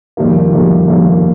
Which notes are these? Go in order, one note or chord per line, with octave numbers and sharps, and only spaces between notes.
F2 D#3 G3 A#3
F2 D#3 G3 A#3
F2 D#3 G3 A#3